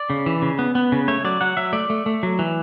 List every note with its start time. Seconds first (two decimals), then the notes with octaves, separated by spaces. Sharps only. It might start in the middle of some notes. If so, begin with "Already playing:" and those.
Already playing: D5
0.10 C#3
0.26 E3
0.42 C#3
0.59 B3
0.75 B3
0.92 C#3
1.08 A3 C#5
1.25 F#3 D5
1.41 F#3 F#5
1.57 F#3 E5
1.73 A3 D5
1.90 A3
2.06 A3
2.23 F#3
2.39 E3